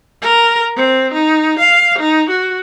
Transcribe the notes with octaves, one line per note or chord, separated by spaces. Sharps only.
A#4
C4
D#4
F5
D#4
F#4